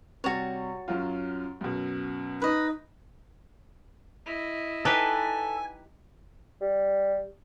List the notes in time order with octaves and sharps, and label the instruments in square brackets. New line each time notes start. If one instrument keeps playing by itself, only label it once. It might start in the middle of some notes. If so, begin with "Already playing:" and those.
[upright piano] C3 G3 A6 [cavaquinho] F#4 C#5
[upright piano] F#2 F#3 F4
F#2 B2
[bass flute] D#4 [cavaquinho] B4 D#5
[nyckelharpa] E4 D#5
[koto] D#4 G4 B4 [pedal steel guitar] A4 [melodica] G#5
[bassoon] G3